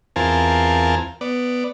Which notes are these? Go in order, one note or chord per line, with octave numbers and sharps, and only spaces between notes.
E2 C4 F4 A#4 G#5 A5
B3 D5